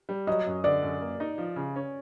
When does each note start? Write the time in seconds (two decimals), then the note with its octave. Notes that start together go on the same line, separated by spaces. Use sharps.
0.09 G3
0.27 F#3 D#5
0.47 F#2
0.64 D3 D5
0.83 F#2
1.01 A#3
1.20 D#4
1.38 F3
1.56 C#3
1.76 C#4